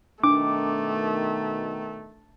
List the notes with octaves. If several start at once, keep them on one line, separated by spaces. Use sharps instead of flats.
B2 D#3 A3 D4 D6